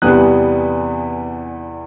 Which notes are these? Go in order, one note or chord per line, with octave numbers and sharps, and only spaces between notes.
E2 C3 E3 G3 B3 D#6 F#6